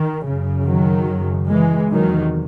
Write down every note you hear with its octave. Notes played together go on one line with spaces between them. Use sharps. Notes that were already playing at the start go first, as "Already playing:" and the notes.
Already playing: D#3
F#2 C#3
D#3 F#3
F#2 C#3
E3 G#3
E2 C3 D#3 F#3